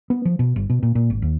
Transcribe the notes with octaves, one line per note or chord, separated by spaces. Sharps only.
B3
F3
B2
G1
B2
A#2
A#2
G#1
D#2